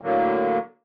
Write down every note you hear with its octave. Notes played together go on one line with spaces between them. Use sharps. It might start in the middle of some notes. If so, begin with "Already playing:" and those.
A2 D3 F#3 A#3